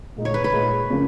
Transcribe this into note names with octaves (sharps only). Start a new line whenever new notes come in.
A#2 G#3 D#4
C#5
B4
B4
A#2 G#3 D#4
C#3 F3 A#3 C#4